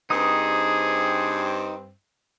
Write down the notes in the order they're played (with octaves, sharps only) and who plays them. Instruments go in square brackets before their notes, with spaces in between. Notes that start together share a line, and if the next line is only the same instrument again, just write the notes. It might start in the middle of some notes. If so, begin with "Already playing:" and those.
[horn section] G2 C4 [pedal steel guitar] D#4 D#6 [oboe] G#4